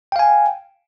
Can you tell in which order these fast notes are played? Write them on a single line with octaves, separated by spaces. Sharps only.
G5 F5 G#5